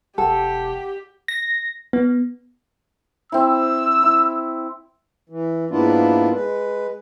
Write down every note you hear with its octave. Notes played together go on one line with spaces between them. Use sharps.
E1 G4 A4 F#5 G5
A#6
B3
C4 E4 E6
E4
E3
G#2 A#3 B3 D4 E4 F4
G#3 B4